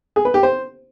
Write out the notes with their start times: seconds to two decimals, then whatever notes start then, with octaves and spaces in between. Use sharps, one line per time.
0.16 G#4
0.25 B4
0.34 G4
0.43 C5